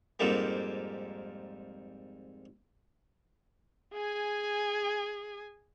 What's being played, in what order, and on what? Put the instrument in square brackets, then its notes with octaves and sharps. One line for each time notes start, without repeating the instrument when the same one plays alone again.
[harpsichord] F2 G#2 G3 A#3
[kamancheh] G#4 G#5